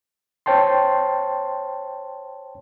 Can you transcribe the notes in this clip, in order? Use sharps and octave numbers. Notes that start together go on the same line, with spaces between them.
C5 C#5 G5 A5 C6